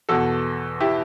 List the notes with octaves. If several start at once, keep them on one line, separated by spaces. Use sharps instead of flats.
E2 B2 F#4 A4
E4 G4